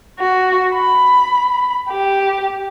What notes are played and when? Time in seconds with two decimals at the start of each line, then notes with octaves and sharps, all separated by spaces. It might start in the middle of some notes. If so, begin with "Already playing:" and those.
0.18 F#4
0.71 B5
1.88 G4